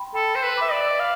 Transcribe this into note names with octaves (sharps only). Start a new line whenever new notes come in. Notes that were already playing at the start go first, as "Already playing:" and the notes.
Already playing: G5 B5 C6
A4 G5 B5
C5
B4
E5 B5 D6
D5
F5 D6